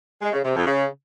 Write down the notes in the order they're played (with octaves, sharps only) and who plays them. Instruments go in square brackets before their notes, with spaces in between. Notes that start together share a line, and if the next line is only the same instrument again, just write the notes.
[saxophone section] G#3
C#3
C3
F2
C#3